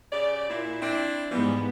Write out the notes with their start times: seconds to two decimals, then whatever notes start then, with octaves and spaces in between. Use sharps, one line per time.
0.13 C#3 G4 D5
0.50 A#2 E4
0.82 C4 D4 E4
1.31 G#2 E3 F3 G3 B3